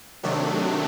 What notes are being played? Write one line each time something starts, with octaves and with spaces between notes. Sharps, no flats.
C3 D#3 F#3 A3 D4